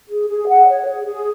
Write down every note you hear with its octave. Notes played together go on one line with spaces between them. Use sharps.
G#4
G#4
F#5
C#5
G#4
G#4